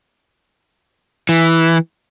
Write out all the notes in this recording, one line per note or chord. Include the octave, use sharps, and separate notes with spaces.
E3